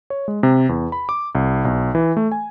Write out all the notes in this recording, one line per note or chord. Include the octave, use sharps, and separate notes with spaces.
C#5
G#3
C3
E2
B5
D6
C2
B1
E3
A3
G#5